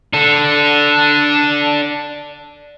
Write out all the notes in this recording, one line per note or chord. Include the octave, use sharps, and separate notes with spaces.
D4 A4